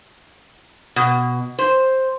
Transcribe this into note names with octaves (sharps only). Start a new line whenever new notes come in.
B2
C5